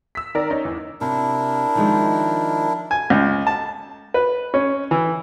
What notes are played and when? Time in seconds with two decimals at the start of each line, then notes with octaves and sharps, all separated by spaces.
0.15 E6 B6
0.35 D#3 A#4 D5 A#6
0.50 C#4 D#4
0.65 E2
1.01 C3 D4 E4 A#4
1.75 D#3 F3 G#3
2.91 G#5
3.10 C#2
3.47 A5
4.14 B4
4.54 C#4
4.91 E3